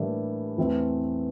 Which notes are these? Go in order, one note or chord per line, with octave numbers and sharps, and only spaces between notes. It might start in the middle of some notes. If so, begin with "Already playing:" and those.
Already playing: A2 E3 G3 A#3 D4
E2 E3 A3 C4